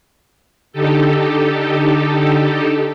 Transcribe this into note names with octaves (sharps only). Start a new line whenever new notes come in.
D3 D#4 G4 A4